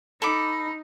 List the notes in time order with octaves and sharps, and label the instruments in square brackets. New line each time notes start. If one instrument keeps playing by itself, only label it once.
[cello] D#4 [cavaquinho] A4 B5 D6